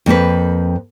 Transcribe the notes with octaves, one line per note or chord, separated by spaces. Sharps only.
F2 A#3 C4 B4